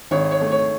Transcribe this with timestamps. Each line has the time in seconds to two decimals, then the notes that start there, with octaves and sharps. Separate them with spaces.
0.11 G#1 C#5
0.31 C#5
0.41 A3
0.51 C#5